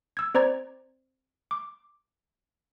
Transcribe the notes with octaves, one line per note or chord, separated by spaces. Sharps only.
E6 G#6
C4 C5 D5 A#5 G#6
D6